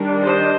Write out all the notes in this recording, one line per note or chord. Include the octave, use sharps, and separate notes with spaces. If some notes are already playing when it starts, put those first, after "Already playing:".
Already playing: D#3 G3 D4
C5 D#5